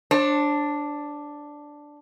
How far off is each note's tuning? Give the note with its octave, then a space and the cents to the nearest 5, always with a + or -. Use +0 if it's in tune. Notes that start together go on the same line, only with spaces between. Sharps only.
D4 +0 C5 +45